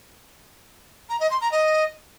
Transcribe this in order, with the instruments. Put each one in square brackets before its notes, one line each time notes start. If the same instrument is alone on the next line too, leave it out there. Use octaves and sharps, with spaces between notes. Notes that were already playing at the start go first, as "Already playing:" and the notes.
[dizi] A#5
D#5
C6
A#5
D#5